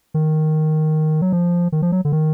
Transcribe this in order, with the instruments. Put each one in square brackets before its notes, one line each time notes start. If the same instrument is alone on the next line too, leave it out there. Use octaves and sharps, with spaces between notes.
[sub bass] D#3
F#3
F3
D#3
F3
F#3
D3
D#3